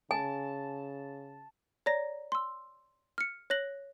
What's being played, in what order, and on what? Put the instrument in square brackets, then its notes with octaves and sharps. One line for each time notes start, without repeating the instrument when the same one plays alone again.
[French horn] C#3 [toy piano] G#5 [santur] A5
[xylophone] C#5 D5 A#5 A#6
C6 E6
F6 C#7
C#5 F#6 A#6 F#7